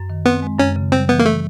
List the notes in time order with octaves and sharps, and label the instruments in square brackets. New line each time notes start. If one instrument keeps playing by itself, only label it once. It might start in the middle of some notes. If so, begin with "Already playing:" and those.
Already playing: [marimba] F#2
D#3
[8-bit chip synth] B3 [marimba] C4
[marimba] G#3
[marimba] F#2 [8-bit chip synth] C#4
[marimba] C#3
[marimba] G3 [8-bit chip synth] C4
[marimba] E3 [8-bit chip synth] B3
[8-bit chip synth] A#3
A3